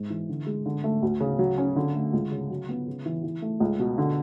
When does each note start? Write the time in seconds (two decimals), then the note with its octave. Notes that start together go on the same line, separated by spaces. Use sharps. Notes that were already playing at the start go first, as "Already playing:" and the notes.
Already playing: G#2
0.10 E3
0.29 D3
0.46 G#3
0.66 D3
0.84 A3
1.02 D2
1.20 C#3
1.39 F#3
1.58 C#4
1.76 D3
1.95 A3
2.13 C#2
2.31 C#3
2.50 F#3
2.69 B3
2.87 C#3
3.06 E3
3.23 E3
3.42 A3
3.60 C#2
3.79 B2
3.98 D3